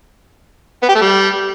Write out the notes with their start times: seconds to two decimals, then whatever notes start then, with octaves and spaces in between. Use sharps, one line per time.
0.82 B3
0.89 G4
0.95 A3
1.01 G3